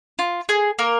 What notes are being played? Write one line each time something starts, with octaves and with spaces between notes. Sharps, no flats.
F4
G#4
A#3 A#4